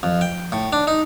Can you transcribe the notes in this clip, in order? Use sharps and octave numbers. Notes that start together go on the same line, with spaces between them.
F2
G5
A2
D4
D#4